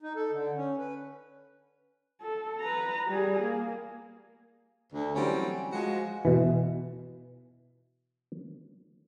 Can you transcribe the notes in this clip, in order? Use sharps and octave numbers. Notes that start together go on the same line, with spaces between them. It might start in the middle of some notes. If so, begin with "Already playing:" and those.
D#4
A4
D3
C#4
B4
A4
B4 A#5
G3 G#4
A#3
D2
E3 F#3 G3 A3 C4 C#4
F3 G#3 F#4
B2 E3